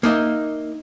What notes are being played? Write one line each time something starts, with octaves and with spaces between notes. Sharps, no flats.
A#3 D#4 D#5 E5